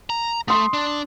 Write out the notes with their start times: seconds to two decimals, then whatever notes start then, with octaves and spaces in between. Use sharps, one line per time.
0.10 A#5
0.48 A3 C6 D#6
0.74 D4